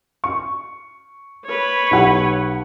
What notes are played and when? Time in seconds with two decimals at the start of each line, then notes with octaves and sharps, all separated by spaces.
0.24 C#6
1.45 B4 C#5
1.91 B1 G4 F#5